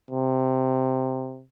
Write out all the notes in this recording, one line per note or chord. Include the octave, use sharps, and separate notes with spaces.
C3